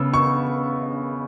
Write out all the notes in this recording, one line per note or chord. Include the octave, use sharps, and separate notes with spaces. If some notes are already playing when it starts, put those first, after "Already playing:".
Already playing: C#3 B3 E6
C#6